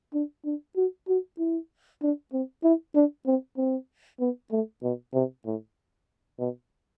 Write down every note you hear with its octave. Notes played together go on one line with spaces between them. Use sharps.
D4
D4
F#4
F#4
E4
D4
C4
E4
D4
C4
C4
B3
A3
B2
C3
A2
B2